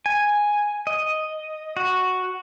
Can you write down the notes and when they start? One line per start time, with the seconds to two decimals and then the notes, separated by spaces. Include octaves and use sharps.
0.06 G#5
0.87 D#5
1.77 F#4